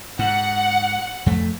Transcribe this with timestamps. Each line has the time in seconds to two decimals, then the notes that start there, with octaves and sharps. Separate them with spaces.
0.19 G#2 F#5
1.26 F2 A3